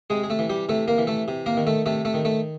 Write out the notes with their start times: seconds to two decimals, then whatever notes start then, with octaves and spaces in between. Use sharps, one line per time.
0.10 C3 G#3 G#4
0.24 G#4
0.30 A3 A4
0.39 E3
0.50 G3 G4
0.69 C3 A3 A4
0.88 A#3 A#4
0.98 E3
1.07 A3 A4
1.28 C3
1.46 A#3 A#4
1.57 D#3
1.67 A3 A4
1.86 C3 A3 A4
2.05 A3 A4
2.14 D#3
2.25 A3 A4